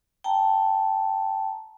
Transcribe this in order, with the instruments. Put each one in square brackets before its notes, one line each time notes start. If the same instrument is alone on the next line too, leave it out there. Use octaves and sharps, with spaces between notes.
[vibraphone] G5 A5 A#5